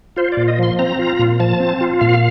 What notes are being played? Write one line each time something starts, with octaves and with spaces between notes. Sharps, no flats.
F4 C5
D5
A#2
D#5
F3 C6
C4 A#5
F4
A#2
F3 A5
C4
F4
A#2 F5